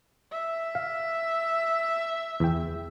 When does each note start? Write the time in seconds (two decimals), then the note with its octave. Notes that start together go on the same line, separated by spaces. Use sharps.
0.31 E5
0.75 F5
2.40 E2 G5